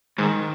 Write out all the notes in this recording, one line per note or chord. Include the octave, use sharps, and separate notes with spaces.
G#2 D#3